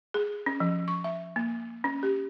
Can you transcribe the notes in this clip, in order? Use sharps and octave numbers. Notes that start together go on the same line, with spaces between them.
G#4
C#4
F3
C#6
E5
A#3
C#4
G4